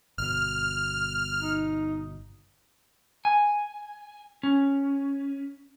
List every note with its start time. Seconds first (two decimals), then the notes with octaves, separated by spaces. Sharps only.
0.18 G1 B2 F6
1.41 D#4
3.25 G#5
4.43 C#4